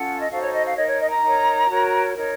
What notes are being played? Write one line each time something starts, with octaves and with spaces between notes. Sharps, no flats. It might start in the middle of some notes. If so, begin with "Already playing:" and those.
Already playing: C#4 F4 A4 F#5
D#5
D#4 F#4 A4 C5 F5
C#5
D#5
F5
D#4 A#4 C#5 D#5
C#5
D#5
A#5
D#4 A#4 C#5
F#4 A#4 C#5
D#4 A#4 C#5